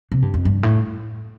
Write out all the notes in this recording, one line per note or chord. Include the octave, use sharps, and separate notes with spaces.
C3
G2
F2
G2
A2